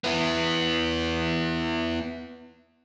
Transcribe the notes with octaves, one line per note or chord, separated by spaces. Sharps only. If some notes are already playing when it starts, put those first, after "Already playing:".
B3 E4